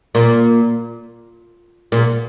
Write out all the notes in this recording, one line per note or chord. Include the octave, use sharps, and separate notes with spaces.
A#2
A#2